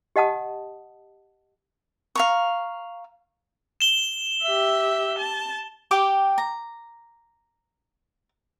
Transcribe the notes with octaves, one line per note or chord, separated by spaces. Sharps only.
G4 D#5 F#5 A5 D#6
F5 A#5 C#6
E7 G7
G4 E5
A5
G4 G5 D6
A#5